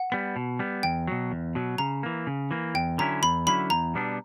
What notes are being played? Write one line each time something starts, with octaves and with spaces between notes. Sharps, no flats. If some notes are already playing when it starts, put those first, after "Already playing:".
Already playing: F#5
G3 B3
B2
G3 B3
E2 G5
B2 F#3
E2
B2 F#3
C#3 A#5
E3 A#3
C#3
E3 A#3
E2 G5
D3 F#3 C#4 E4 A#5
E2 B5
D3 F#3 C#4 E4 B5
E2 A#5
B2 G3 B3 D4